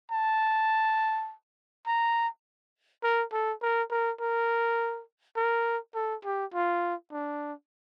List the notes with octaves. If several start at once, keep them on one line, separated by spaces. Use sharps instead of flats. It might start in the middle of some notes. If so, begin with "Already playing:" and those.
A5
A#5
A#4
A4
A#4
A#4
A#4
A#4
A4
G4
F4
D4